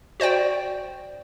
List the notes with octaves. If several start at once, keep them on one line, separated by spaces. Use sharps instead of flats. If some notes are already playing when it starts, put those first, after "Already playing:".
F#4 C5 D5 G5